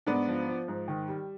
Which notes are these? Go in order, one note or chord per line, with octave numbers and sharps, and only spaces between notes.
G#2 B3 D4
F3
F3
G#2
D#3
G3